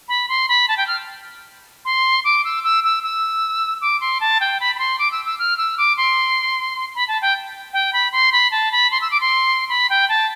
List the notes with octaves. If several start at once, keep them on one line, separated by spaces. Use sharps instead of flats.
B5
C6
B5
A5
G5
F6
C6
D6
E6
E6
E6
E6
D6
C6
A5
G5
B5
B5
C6
D6
E6
E6
F6
E6
D6
C6
B5
A5
G5
G5
B5
C6
B5
A5
B5
C6
E6
D6
C6
B5
G5
A5